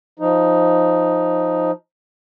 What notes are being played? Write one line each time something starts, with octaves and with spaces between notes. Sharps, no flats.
F3 D#4